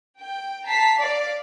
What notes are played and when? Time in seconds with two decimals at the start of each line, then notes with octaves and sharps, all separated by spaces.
0.21 G5
0.68 A5 A#5 B6 C7
0.99 D5 F5